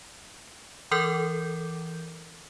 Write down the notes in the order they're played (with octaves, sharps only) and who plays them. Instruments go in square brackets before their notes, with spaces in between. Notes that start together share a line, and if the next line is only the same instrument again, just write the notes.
[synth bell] E3 A4 A#4 D6 G6